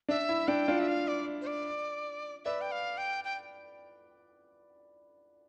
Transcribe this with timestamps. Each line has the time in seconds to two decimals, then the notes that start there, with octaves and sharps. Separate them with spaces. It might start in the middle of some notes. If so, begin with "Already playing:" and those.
0.09 D4 E5
0.29 E4
0.48 D4 G5
0.68 D4 F4
0.79 E5
0.88 F5
1.08 D5
1.42 C5
1.47 D5
2.45 B4 D5 E5
2.61 G5
2.72 F5
2.98 G5
3.24 G5